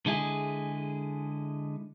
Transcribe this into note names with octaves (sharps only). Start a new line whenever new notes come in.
D3 G#3 E4 G#4